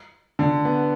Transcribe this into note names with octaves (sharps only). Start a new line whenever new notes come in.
D3
B3